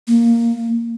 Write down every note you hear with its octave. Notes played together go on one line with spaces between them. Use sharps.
A#3